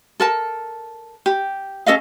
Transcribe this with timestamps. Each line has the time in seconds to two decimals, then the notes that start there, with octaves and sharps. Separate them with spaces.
0.20 A4 A#4 A5
1.26 G4
1.86 C#4 A4 D#5 F5